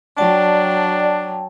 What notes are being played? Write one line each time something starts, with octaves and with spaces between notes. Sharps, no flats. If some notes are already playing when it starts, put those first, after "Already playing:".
F#3 D4 D5 G5 A5